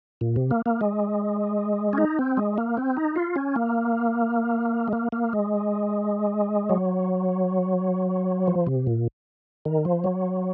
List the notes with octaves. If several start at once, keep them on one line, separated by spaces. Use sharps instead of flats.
A#2
C3
A#3
A#3
G#3
C#4
D#4
C4
G#3
A#3
C4
D#4
F4
C#4
A#3
G#3
A#3
A#3
G#3
F#3
F3
C3
A#2
D#3
F3
F#3